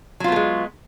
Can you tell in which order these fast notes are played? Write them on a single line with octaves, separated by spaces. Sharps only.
F#3 F4 B3 A3 G#3